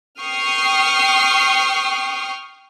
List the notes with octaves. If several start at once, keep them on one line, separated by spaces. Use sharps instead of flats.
G5 C#6 D#6 F6 C7